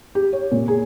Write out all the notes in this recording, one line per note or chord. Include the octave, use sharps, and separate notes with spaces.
G4
C#5
A#2
G#4